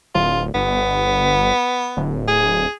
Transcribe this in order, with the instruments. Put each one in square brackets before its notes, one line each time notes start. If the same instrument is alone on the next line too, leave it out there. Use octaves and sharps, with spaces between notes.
[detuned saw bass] D1 [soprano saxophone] F4
[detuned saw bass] G1 [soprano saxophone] B3
[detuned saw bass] D1
[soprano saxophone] G#4